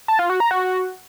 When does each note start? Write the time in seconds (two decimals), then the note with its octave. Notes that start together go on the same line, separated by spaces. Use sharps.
0.08 A5
0.19 F4
0.30 F#4
0.40 A#5
0.51 F#4